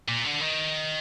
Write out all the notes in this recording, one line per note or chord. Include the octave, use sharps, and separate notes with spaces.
A#2
D3
D#3